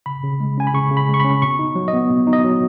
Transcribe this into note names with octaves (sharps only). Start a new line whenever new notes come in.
C#3 B5
C#3
G#3
C#4 G#5
B5
C#3 C#6
C#3
B5
G#3
C#6
C#4 B5
B2 C#6
D#4
F#3
D#5
B3
B2
D#4
D#5
F#3